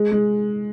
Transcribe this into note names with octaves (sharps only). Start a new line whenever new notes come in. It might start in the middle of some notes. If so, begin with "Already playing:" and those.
Already playing: G#3
G#3